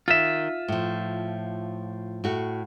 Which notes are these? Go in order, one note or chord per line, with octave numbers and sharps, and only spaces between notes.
D#3 F4 E5
A2 F3
A2 F#4